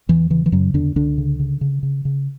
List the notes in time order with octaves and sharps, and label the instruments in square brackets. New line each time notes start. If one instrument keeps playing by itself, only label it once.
[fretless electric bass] E2 E3
C#3 E3
E3
F#2 C#3 F#3
E2 D3 D4
C#2 D3 D4
C#3
C#3
C#3
C#3
C#3